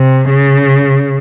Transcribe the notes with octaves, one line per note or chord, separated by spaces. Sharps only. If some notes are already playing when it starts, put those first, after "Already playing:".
Already playing: C3
C#3